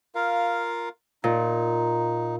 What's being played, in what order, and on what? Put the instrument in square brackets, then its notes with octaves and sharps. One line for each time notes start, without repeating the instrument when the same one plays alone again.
[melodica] F4 A#4 F5
[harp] A#2 [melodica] D#4